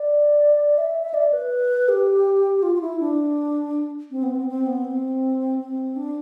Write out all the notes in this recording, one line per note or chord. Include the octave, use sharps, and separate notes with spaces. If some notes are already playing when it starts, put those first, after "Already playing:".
Already playing: D5
E5
E5
D5
B4
G4
F4
F4
E4
D4
C4
B3
C4
C4
B3
C4
C4
D4